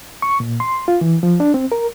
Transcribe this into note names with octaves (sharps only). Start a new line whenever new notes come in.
C#6
A#2
C6
F4
E3
F3
D4
C4
A#4